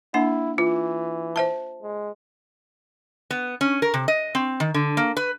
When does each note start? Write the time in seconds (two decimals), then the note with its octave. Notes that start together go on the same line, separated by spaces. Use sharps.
0.14 A#3 D4 E4 F#5
0.58 E3 F4
1.36 C5 E5 A5
1.83 G#3
3.31 B3
3.61 C#4
3.82 A#4
3.94 C3
4.08 D#5
4.35 C4
4.60 D#3
4.74 D3
4.97 A#3
5.17 B4